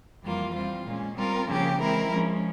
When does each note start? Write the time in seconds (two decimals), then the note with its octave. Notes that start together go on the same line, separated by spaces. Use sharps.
0.23 F2 E3 G3 A#3 F4
0.54 G3 C4 F4
0.85 A#2 G#3 C#4
1.17 G3 C4 F4 A#4
1.48 C#3 F3 A#3 C#4 G4
1.80 E3 G#3 C4 E4 A#4
2.11 F3 G#3 C#4